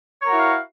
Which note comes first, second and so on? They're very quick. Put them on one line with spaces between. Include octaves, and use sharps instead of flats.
C#5 A#4 F#4 E4 F5